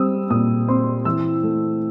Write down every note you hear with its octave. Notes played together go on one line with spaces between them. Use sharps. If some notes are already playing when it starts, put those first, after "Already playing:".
Already playing: G3 C4 D#6 E6
A#2 D#6
C4 C6
E3 E6
A3